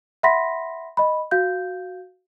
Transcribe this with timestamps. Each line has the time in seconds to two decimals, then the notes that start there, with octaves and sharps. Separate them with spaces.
0.23 E5 F#5 B5 C6 A#6 B6
0.97 D#5 B5
1.31 F#4 F5 G6